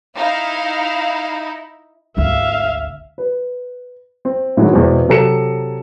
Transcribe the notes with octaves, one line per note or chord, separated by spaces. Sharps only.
D#4 E4 F5
G#1 D2 E5 F5
B4
C4
A2 D3 D#3 F#3 G#3
E2 B2 G#3 C4
C3 F#3 A4 A#5 C#7 E7